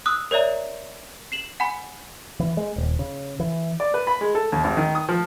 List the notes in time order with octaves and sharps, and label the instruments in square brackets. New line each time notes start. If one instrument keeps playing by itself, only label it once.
[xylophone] D#6 E6 F#6
A#4 C#5 D5 E5 A#5
C7 E7 F#7
F#5 G#5 B5
[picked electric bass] E3
G#3
D#1
C#3
E3
[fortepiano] D5
B4
B5
G#3
A4
D#2
G#1
D#3
D#6
F3